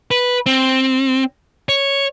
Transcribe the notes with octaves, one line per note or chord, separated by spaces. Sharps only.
B4
C4
C#5